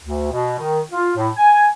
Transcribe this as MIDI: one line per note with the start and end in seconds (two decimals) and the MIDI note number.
0.03 0.27 38
0.32 0.59 47
0.59 0.80 51
0.92 1.11 65
1.16 1.29 45
1.37 1.66 80